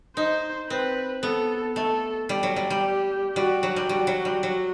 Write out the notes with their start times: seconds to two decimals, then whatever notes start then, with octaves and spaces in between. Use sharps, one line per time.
0.17 D#4 C5
0.70 C4 B4
1.23 B3 A4
1.76 A3 A4
2.29 G3
2.43 F#3
2.56 G3
2.70 G3
2.84 G4
3.36 G3 F#4
3.63 F#3
3.76 G3
3.89 G3 F#4
4.07 F#3
4.25 G3
4.43 F#3 F#4